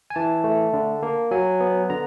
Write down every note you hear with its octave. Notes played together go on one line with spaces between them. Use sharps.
G#5
E3 A5
A3
D3
A#3
F#3 G#5
B3
D3 A#5